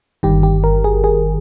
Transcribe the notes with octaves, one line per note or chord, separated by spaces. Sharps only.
G1 G2 D#3 G4
G4
A#4
G#4
G#4